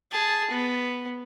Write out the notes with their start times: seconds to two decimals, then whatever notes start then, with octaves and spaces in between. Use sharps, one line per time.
0.11 G#4 A5
0.51 B3